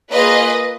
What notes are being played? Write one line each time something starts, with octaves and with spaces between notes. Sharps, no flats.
A#3 F4 G#4 B4 D#5